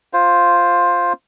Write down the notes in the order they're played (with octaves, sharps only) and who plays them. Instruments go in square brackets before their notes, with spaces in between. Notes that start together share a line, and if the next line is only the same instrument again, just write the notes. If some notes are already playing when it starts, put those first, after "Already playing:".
[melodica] F4 C5